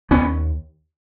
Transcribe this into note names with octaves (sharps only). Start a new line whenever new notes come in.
D#2 B3 C#4